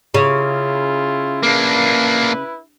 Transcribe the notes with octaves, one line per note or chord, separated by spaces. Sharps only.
C#3 E4 F4
A#3 D4 E4 B4